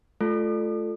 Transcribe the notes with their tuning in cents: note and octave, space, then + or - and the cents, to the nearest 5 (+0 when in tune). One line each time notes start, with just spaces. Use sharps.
A3 -30 F4 +0 A4 +0